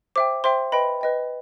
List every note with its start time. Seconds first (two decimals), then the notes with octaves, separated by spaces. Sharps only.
0.16 C5 E5 G5 D6
0.44 C5 E5 G5 C6
0.72 B4 D#5 G5 B5
1.01 B4 D#5 G5